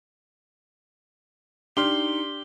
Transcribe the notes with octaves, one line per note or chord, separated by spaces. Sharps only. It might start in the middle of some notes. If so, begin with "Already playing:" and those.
D4 D#4 G4 C6 F6 G7